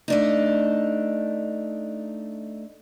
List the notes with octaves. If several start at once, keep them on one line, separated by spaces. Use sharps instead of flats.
A3 D4 D#4